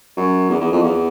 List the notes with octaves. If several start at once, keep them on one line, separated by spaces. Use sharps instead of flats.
F#2
E2
E2
F2
E2